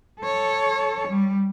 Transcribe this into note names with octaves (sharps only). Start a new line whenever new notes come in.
A4 C#5
G3